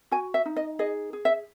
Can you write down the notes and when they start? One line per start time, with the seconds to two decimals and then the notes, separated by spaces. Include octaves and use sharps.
0.11 F#4 G#5
0.34 E5
0.46 D#4
0.56 D#5
0.79 G#4 D#5
1.13 G#4
1.25 E5